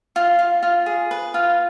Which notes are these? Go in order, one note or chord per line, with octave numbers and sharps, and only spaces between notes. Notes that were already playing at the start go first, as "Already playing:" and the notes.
F4
F4
F4
G#4
B4
F4